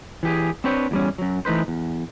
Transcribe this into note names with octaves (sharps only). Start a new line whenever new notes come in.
E3 G4 G#4
C4 D4 B4 C#5 G5
E2 G3 C#4
F#2 F#3
E3 A3 D#4 B4 C5
E2